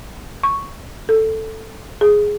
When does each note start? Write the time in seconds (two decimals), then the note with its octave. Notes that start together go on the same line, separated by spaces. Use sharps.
0.43 C#6
1.09 A4
2.01 G#4